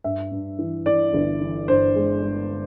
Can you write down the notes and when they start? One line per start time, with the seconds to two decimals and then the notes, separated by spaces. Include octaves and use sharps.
0.04 G2 E5
0.32 G2
0.59 E3
0.86 E3 D5
1.13 G1
1.41 E3
1.68 G2 C5
1.95 G#3
2.23 G#3